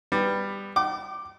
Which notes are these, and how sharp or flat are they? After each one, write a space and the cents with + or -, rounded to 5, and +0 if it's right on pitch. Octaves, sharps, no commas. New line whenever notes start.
G3 +15 B3 +5
G5 -40 D6 +10